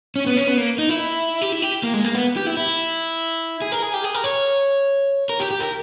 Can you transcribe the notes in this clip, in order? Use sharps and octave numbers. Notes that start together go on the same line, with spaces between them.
C#4
B3
C#4
B3
A#3
D#4
E4
G4
E4
G4
A#3
G#3
A#3
B3
G4
E4
E4
G#4
A#4
G#4
G4
G#4
A#4
C#5
A#4
G4
G4
A#4